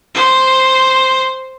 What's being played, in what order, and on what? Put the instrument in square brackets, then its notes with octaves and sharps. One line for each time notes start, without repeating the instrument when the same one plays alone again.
[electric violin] C5